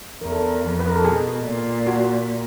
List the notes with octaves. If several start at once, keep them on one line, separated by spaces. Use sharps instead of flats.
E2 A#4
A4
A#4
F2
B4
A#4
A4
B2 G#4
A#2
F#4